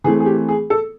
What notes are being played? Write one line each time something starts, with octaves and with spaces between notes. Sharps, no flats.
E3 A3 C4 G#4
G#4
G4
G#4
A4